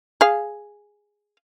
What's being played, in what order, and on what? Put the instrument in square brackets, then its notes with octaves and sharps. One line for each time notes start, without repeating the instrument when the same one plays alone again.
[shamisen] G#4 F5